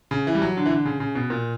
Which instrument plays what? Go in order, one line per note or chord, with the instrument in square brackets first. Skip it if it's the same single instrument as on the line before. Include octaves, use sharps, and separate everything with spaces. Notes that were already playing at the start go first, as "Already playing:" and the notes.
[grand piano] C#3
E3
G3
F#3
D3
E3
D3
C#3
C#3
B2
A#2